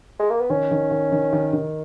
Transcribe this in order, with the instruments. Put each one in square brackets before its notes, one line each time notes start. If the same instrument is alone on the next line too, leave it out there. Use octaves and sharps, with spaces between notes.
[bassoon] G#3
A#3
B3
[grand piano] D#3 [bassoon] C#4
[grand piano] D#3
D#3
D#3
D#3
D#3